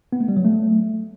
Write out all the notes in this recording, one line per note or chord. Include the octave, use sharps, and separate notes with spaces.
B3
A3
G3
F#3
A3